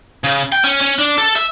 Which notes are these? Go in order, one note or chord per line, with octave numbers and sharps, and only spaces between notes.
C#3
G5
C#4
C#4
D4
A4
E5